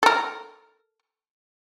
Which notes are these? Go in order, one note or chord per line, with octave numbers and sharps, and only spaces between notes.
A4 A#4